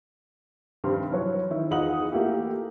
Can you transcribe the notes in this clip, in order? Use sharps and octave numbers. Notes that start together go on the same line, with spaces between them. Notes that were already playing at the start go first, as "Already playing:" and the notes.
G2 C3 D#3 G3 C6 F6
E3 F#3 B4 C#5
D#3 E4
E2 D#4 F4 F#5 D#6 F#7
A3 A#3 E4 F4 G4